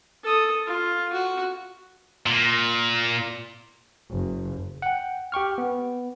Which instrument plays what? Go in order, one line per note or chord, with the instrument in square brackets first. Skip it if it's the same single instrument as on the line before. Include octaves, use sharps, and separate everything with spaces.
[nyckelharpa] A4 D#6
F4
F#4
[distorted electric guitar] A#2
[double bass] F#1
[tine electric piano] F#5 G5
G4 G5 C#6 F6
B3